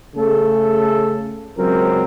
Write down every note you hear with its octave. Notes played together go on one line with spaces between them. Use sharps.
C#3 A3 G#4 A4
C#2 F#3 C4 A#4